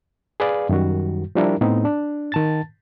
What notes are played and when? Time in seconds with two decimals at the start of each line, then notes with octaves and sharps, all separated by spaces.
0.40 G#4 B4 D5 F5
0.69 F#2 D#3 G3 F#4
1.35 F3 G3 D4 E4 A#4
1.61 A2 B3 C4 D#4
1.85 D4
2.32 D#3 A5 A6